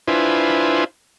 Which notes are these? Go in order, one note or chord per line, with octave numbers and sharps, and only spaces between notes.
D4 E4 F4 B4 C5 G#5